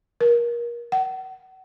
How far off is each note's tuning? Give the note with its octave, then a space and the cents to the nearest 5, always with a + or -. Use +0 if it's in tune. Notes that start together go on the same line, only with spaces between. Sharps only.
A#4 +30
F#5 +35